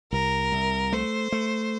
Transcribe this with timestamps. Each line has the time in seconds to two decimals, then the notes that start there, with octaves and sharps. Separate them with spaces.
0.12 C2 A#4
0.52 C2
0.93 A3 C5
1.32 A3